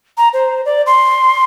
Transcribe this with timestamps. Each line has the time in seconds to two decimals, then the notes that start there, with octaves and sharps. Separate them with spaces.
0.17 A#5
0.33 C5
0.65 D5
0.86 C6